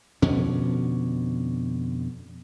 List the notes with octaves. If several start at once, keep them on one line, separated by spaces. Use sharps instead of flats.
F2 B2 D3 C#4